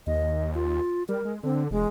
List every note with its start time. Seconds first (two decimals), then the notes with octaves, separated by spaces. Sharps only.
0.07 D#2 D#5
0.54 F4
1.09 G3 A#4
1.25 G#3
1.43 D3 C4
1.71 E1 G#3